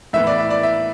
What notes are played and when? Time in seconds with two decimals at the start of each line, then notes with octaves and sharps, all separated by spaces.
0.13 A2 E3 B3 E5
0.27 D5
0.38 E5
0.51 D5
0.63 E5